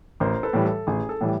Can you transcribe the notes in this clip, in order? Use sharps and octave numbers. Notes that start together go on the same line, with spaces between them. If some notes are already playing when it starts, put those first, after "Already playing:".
A1 A#4 C5
A4 B4
A2 E3 G3
A4
A1 G#4
A4
A2 E3 G3